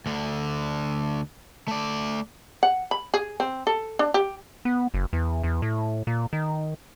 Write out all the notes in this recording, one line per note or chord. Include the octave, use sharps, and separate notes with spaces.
D2 D3
A3 D5
F#5
B5
G#4
C4
A4
D4
G4
B3
F#1
E2
E2
A2
A#2
D#3